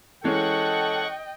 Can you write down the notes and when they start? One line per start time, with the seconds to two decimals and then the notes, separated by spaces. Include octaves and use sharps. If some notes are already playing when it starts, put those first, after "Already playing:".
0.24 E3 G#3 C#4 A4 D#5 F#5 G5 C#6